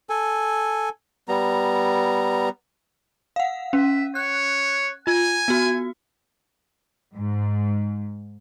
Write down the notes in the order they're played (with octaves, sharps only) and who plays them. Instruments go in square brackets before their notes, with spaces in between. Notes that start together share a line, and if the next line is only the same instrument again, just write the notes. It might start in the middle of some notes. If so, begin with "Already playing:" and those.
[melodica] A4 G#5
G3 B3 A#5
[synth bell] F5 F#5
[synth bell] C#4 [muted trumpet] E5
[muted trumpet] C#5 [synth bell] F#6
[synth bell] F4 [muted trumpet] G#5
[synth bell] B3 F#4
[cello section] G#2